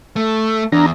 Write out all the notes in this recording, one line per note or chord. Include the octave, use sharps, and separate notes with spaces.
A3
E2 D4 A#5